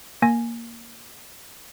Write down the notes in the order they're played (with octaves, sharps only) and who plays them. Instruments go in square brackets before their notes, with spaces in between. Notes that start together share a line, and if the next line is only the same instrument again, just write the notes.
[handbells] A#3 G#5 A#6